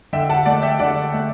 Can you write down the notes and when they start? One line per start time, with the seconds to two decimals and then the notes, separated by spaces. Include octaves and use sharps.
0.13 D3 E5 G5
0.30 F#5 A5
0.45 A3 D5 F#5
0.62 E5 G5
0.79 D3 D5 F#5
1.14 A3